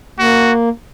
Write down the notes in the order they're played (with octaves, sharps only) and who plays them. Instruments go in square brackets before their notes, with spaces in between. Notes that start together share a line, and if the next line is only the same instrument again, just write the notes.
[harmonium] A#3 [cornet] F#4